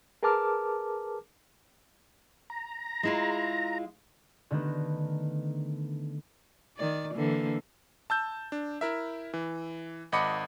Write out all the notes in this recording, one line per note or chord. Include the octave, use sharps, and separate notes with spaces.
G#4 A#4 B4 A5 D6 F6
A#5
G#3 E4 F4
D3 D#3 A3 B3 A#4
D#3 D5
D3 E3 A#3
A5 E6 G6
D4
E4 A#4 E5
E3
G#1 D#5 F#5 B5 D6 C#7